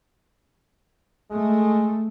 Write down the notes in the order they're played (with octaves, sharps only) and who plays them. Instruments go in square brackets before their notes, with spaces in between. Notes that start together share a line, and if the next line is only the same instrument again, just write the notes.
[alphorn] G#3 [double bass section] A3